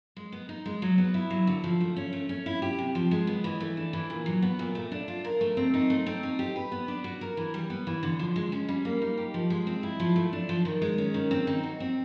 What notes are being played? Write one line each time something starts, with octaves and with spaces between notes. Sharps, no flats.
G#3
B3
D#4
G#3
F#3
B3
E4
F#3
D3
F3
A3
C#4
A3
C#4
E4
G4
C3
F3
G#3
B3
E3
A3
D4
E3
A#2
F#3
B3
A#2
A3
D4
F4
A#4
A3
C4
D#4
A3
C4
D#4
G4
B4
B3
D4
F#4
A#4
E3
G3
B3
E3
D3
F3
G#3
C#4
G3
A#3
D#4
G4
F3
G#3
C4
E4
F3
A3
D4
F3
D#3
G#3
C#4
D#3
C4
D#4
F#4
C4